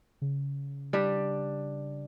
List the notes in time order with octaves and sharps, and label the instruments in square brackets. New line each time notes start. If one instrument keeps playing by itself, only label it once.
[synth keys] C#3
[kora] G3 D4 G4